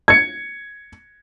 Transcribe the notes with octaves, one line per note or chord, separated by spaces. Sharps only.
G#6 C#7